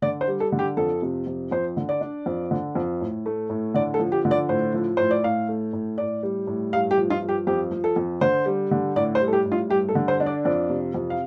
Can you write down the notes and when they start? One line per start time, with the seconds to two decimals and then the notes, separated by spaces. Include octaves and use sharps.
0.02 D3 D5
0.21 C5
0.28 G3
0.40 A4
0.52 D3
0.59 G4
0.77 F2 A4
1.02 C3
1.27 F2
1.51 F2 C5
1.77 D3
1.89 D5
2.01 D4
2.26 F2
2.51 D3
2.75 F2
3.01 A2
3.26 A3
3.50 A2
3.74 D3 D5
3.94 A4
4.00 F3
4.12 G4
4.25 D3
4.31 D5
4.49 A2 C5
4.74 F3
4.97 A2 C5
5.11 D5
5.24 A2 F5
5.48 A3
5.73 A2
5.98 A2 D5
6.23 G3
6.47 A2
6.73 G2 F5
6.91 G4
6.97 F3
7.10 F4
7.22 G2
7.29 G4
7.47 F2 G4
7.71 F3
7.84 A4
7.96 F2
8.21 D3 C5
8.46 G3
8.71 D3
8.96 A2 D5
9.15 C5
9.21 G3
9.28 A4
9.33 G4
9.46 A2
9.52 F4
9.70 G2 G4
9.89 A4
9.95 D3
10.08 C5
10.20 D4
10.26 D5
10.45 F2 D5
10.69 C3
10.94 F2
11.10 F5